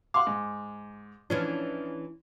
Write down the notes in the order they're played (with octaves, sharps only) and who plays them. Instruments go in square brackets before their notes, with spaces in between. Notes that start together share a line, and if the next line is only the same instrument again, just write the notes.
[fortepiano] F5 F#5 [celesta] C6 D6
[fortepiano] G#2
[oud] E3 C#4 D4 [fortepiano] F3